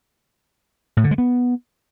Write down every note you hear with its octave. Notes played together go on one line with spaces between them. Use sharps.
A2
D3
G#3
B3